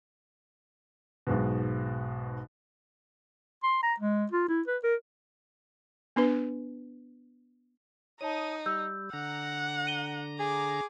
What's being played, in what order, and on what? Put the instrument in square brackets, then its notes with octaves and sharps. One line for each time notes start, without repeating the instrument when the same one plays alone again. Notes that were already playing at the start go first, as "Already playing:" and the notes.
[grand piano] B1 G#2 B2
[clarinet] C6
A#5
G#3
F4
E4
B4
A#4
[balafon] B3 D4 B4
[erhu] D#4 [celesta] C#5 A5 [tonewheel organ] D#6
[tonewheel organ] G3 [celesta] E6 G6
[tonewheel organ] D3 A#5 [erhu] F#5
[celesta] D#7 G7
[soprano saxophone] G#4 [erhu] D6